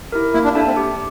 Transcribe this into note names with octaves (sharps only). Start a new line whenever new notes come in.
E4 G4 A#4
A#3 E4
D4
D4 E4 A4 E5 A5
C4
G4